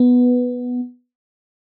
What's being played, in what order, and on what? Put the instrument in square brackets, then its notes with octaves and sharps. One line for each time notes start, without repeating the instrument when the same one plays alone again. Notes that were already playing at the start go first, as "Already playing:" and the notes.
Already playing: [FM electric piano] B3